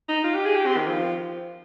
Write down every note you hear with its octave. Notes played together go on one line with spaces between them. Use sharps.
D#4
F4
G4
G#4
G4
C4
D#3
F3